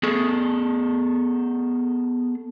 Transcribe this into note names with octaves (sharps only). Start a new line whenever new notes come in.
B3 G#4 A4